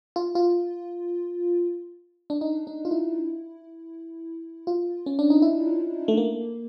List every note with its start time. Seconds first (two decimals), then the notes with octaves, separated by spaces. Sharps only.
0.16 F4
0.35 F4
2.30 D4
2.41 D#4
2.67 D#4
2.85 F4
2.91 E4
4.67 F4
5.06 C#4
5.19 D4
5.30 D#4
5.42 E4
6.08 A3
6.17 A#3